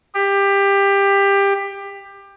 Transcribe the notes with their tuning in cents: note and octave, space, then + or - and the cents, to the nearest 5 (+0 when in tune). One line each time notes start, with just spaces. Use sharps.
G4 +20